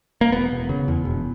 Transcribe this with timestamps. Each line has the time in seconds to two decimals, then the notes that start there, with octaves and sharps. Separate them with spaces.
0.21 A#3
0.32 E1 B3
0.51 E1
0.69 C#3
0.88 E2
1.05 E1